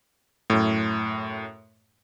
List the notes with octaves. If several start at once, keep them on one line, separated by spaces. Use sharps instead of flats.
F#2 A2